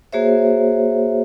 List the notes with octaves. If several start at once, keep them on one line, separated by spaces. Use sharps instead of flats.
A#3 F#4 G#4 C5 C#5 E5